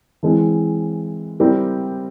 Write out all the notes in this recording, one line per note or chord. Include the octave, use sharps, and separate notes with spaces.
E3 G#3 C4
G3 C4 E4 G4 A#4